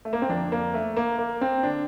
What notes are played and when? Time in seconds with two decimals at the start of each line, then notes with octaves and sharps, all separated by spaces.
0.05 A3
0.13 A#3
0.22 C4
0.29 F2 D3 D4
0.52 A#3
0.74 A3
0.97 A#3
1.18 A#3
1.41 C4
1.63 D3 D4